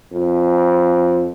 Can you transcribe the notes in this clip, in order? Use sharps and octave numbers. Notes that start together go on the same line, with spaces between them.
F2